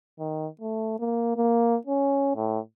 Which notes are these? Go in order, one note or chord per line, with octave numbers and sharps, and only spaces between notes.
D#3
A3
A#3
A#3
C#4
A2